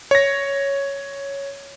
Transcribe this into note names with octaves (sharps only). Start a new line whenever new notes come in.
C#5 A#6